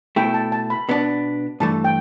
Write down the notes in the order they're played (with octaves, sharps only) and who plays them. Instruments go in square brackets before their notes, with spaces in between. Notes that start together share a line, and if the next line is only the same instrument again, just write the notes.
[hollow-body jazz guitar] B2 A3 E4 [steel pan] G5
[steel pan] A5
A5
B5
[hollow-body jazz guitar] B2 B3 D4
[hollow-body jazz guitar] G2 E3 A3 [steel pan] A5
[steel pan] G5